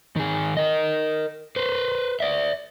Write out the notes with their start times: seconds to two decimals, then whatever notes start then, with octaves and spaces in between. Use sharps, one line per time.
0.16 D#3 G#4
0.57 A#4 D#5
1.56 B4 C5
2.20 D5 E5